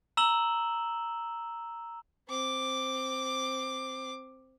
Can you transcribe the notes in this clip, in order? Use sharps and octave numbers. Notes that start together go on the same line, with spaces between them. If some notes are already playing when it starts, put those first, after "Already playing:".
A#5 E6 E7 F#7 G7
C4 D6